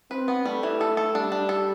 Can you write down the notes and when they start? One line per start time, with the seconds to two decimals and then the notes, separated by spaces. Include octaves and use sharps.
0.11 C4 B4
0.28 B3
0.45 G3 A3
0.63 E3
0.81 A4
0.97 A4
1.15 G3 D4
1.32 D4
1.49 A4